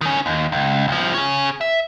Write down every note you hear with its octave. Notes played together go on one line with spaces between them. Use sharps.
D#3 C#4
D#2
C#2
C2 F3
G#4 C#5
E5